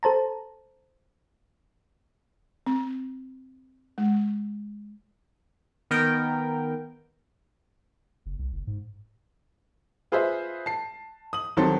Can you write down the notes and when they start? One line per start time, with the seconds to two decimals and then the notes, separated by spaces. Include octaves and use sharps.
0.03 A4 C5 A5 A#5
2.67 C4
3.98 G#3
5.91 D#3 B3 A#4 G5
8.26 F#1
8.39 C2
8.53 F#1
8.67 G#2
10.12 F4 G#4 B4 C5 D#5 E5
10.66 A5 C7
11.33 D#6 F#7
11.57 C2 D#3 F#3 C4 A4 C6